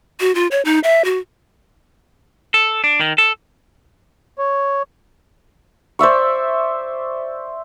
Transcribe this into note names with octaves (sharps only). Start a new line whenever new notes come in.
F#4
F4
C#5
D#4
E5
F#4
A4
D4
D#3
A4
C#5
C5 D5 E5 C#6